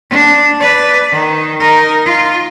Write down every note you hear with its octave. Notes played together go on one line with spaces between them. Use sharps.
D4
B4 D5
D#3
D#4 A#4
F4